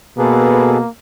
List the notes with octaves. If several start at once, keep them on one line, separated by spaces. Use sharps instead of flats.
B2 A#3 G#4 A4 B4